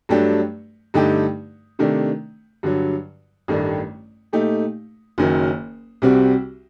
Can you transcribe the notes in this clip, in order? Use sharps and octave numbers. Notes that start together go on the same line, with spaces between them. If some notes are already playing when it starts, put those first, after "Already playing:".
G2 F#3 A3 D4 G4
G2 D3 A3 D#4 G4
C3 D#3 A3 D4
G2 D3 F#3
A1 G2 D#3 A3 D4
A#2 A3 D#4 G4
F#1 F#2 D#3 F#3
C2 C3 G3 C4 F#4